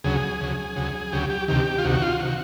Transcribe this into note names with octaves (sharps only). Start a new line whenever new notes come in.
D2 C#3 F#3 G#4
D2 C#3 F#3
D2 C#3 F#3
D2 C#3 F#3 G4
G4
D2 C3 D#3 G4
F4
D2 C3 D#3 F#4
F4
C3 D#3 F#4